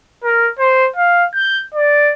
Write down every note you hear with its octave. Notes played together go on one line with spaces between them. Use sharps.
A#4
C5
F5
G6
D5